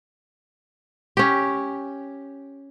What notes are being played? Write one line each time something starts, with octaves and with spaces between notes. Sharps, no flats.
C#4 G4